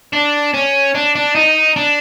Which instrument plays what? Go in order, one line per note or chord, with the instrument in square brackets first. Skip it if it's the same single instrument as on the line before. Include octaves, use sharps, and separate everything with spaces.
[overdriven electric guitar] D4
C#4
D4
D4
D#4
D4